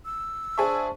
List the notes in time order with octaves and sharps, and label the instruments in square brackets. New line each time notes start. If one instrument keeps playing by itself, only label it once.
[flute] E6
[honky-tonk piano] D4 G#4 E5 [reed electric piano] C5 A5 C#6